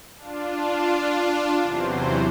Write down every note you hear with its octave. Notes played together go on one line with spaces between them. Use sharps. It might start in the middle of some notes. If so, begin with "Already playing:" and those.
D4 F4
E2 C3 E3 F#3 C5